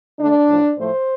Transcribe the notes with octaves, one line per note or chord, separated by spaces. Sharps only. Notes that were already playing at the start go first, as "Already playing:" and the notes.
D3 A3 D4
A2 F3 A3
A2 F3 A3 C5